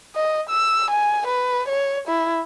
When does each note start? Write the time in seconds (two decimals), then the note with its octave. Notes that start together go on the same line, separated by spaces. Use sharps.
0.15 D#5
0.50 E6
0.90 G#5
1.27 B4
1.68 C#5
2.08 E4